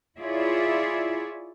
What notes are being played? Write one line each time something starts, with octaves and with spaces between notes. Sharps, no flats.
E4 F4 G#4 C#5 D5 E5